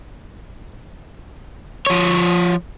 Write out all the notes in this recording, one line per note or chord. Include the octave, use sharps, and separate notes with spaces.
F3 C#5